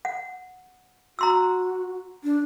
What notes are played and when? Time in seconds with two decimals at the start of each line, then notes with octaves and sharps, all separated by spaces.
0.05 F#5
1.19 F#4 A#5 C6 E6
2.24 D4